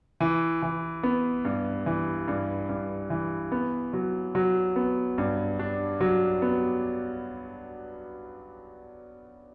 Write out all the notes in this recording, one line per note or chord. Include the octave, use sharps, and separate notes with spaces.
E3
E3
B3
G2
E3
G2
G2
E3
B3
F#3
F#3
B3
G2
D4
F#3
B3